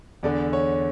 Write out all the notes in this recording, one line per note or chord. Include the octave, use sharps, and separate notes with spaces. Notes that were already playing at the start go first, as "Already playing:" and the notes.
E2 D3 D5
C#5